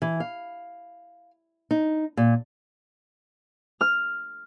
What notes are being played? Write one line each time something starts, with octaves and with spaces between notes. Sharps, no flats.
E3
F5
D#4
A#2
F6